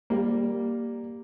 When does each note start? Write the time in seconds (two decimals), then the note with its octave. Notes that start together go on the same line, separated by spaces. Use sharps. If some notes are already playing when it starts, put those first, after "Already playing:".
0.10 G3 A#3